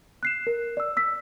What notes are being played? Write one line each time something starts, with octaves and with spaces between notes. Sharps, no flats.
F#6 C7 E7
A#4
D5 E6
E6 B6